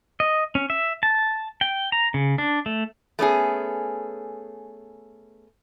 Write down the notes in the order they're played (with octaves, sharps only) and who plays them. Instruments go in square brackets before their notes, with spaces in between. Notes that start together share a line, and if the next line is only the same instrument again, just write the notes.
[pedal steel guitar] D#5
C#4
E5
A5
G5
A#5
C#3
D4
A3
[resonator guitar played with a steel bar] A3 B3 C#4 G#4